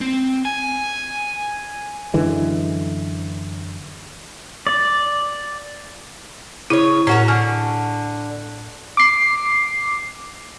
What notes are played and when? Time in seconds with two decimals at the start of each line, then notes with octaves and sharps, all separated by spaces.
0.01 C4
0.45 G#5
2.14 F#2 D3 E3 G#3
4.67 D5
6.70 C#3 E4 C#5
7.07 A2 C#4 F#4 A#4
7.28 D3 G#5 C#6 F6
8.97 D6 C7